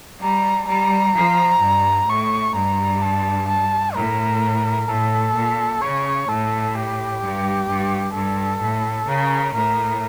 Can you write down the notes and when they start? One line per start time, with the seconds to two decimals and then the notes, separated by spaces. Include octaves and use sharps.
0.22 G3 A#5
0.68 G3 A#5
1.16 F3
1.62 G2
2.08 A2 C#6
2.54 G2 A#5
3.02 A5
3.49 A5
3.94 A2 A#4
4.88 A2 A4
5.35 A#2
5.81 C#3 C#5
6.28 A2 A4
6.75 G4
7.22 G2
7.69 G2
8.15 G2 A4
8.62 A2
9.08 C#3 A#4
9.55 A2 A#4